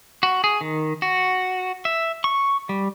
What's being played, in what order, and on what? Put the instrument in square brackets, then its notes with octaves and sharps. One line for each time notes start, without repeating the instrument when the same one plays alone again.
[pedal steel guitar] F#4
G#4
D#3
F#4
E5
C#6
G3